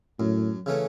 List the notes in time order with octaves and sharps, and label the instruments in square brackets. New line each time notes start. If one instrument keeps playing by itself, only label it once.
[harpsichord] F#2 [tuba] A2
[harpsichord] C#3 E3 A3 C#4